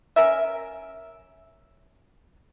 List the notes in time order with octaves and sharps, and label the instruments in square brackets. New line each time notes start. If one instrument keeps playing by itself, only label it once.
[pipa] C#4 A#4 E5